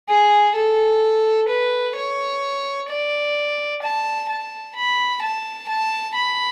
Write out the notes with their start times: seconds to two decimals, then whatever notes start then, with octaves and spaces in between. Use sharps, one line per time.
0.09 G#4
0.56 A4
1.49 B4
1.96 C#5
2.89 D5
3.82 A5
4.29 A5
4.75 B5
5.22 A5
5.69 A5
6.15 B5